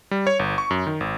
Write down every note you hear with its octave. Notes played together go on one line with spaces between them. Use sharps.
G3
C#5
G1
C#6
F#2
D#3
G#1